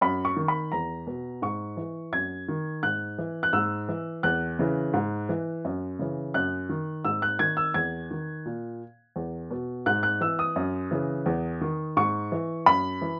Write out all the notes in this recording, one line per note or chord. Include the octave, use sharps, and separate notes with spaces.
F#2 B5
C#6
D#3
B5
E2 A#5
B2
G#2 C#6
E3
F#2 G#6
D#3
G#2 F#6
E3
F#6
G#2 E6
E3
E2 F#6
C#3 E3
G#2
E3
F#2
C#3 E3
F#2 F#6
D#3
G#2 E6
F#6
D#3 G#6
E6
E2 G#6
D#3
A#2
E2
B2
G#2 F#6
F#6
E3 E6
D#6
F#2
C#3 E3
E2
D#3
G#2 C#6
E3
F#2 B5
E3